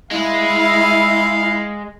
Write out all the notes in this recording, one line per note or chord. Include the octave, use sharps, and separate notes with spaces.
G#3 E4 F5